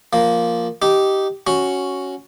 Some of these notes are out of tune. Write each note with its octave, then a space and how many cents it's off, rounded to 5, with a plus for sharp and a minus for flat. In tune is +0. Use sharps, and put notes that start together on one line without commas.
F3 +0 A#3 +0
D#4 +0 G4 -10
C#4 +0 F#4 +0